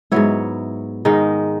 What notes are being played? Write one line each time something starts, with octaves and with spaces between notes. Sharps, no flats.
G#2 F#3 B3 E4 C#5
G#2 D#3 G#3 D#4